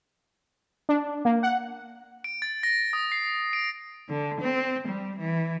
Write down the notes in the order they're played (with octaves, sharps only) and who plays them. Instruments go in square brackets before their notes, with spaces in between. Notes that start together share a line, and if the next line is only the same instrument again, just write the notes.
[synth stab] D4
A#3
F#5
[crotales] D7
A6
A#6
D#6
C7
D7
[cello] D3
C4
G3
E3